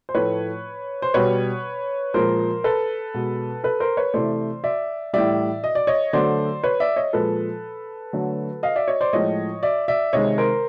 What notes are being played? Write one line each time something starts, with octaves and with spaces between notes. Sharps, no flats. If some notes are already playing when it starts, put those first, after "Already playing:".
C5
A2 F3 A3 B4 C#5
C5
B2 G3 B4 C#5
A#2 F3 G#3 A#4 C5
A4 B4
B2 G#3
A4 B4
A#4 C5
B4 C#5
C3 E3 A3 C5 D5
D5 E5
A2 E3 G3 D5 E5
D#5
D5
C#5 D#5
D3 F#3 A3 C5 D5
B4 C#5
D5 E5
C#5 D#5
A#2 F3 G#3 A4 B4
D3 F#3 A3
D#5 F5
D5 E5
C#5 D#5
C5 D5
A2 F3 G#3 C#5 D#5
D5 E5
D5 E5
C3 D#3 G#3 C#5 D#5
A#4 C5